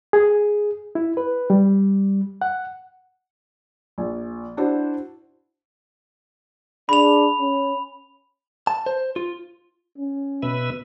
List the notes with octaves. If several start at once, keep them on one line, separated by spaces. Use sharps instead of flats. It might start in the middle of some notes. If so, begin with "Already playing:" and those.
G#4
E4
B4
G3
F#5
A#1
D4 E4 F#4 C5
D4 G#4 B5 F7
C#4
A5
C5
F4
C#4
B2 B4 E5